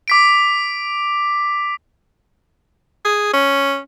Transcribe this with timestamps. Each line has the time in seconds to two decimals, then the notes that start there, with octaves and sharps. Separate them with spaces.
0.08 D6 B6 D7
3.05 G#4
3.33 C#4